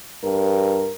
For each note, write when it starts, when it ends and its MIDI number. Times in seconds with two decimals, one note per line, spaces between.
0.24 0.92 43
0.24 0.94 70